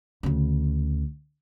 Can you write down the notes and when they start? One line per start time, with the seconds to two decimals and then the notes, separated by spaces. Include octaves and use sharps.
0.23 D2 C#3